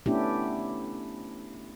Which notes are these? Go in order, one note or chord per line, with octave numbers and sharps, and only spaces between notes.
A3 B3 C#4 D4 E4 G4